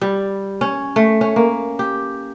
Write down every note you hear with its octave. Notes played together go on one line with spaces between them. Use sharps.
G3
C#4
A3
C#4
A#3
G4